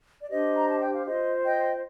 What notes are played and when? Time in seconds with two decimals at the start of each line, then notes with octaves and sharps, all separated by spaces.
0.20 D5
0.30 D4 G4 C5 D#5
0.57 A#5
0.69 A5
0.80 G5
0.93 F5
1.06 F4 C5 D#5
1.44 D#5 G5